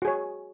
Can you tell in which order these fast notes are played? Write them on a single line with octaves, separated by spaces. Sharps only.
F#4 G#4 C#5